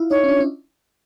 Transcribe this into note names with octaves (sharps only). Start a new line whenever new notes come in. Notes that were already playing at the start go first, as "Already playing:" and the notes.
Already playing: E4 F4
D#4 C#5
C#4
D4
C#4